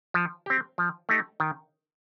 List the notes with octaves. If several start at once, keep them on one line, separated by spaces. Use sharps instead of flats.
F3
C4 G4
F3
A3 D#4 G4
D#3